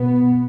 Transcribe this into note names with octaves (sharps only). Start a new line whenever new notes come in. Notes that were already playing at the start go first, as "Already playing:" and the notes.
Already playing: B2 B3